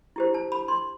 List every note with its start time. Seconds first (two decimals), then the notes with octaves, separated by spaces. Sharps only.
0.16 E4 G4 C5
0.34 A5
0.52 B5
0.68 C6